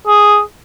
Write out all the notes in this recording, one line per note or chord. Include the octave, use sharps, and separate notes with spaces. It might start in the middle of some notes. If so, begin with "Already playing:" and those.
G#4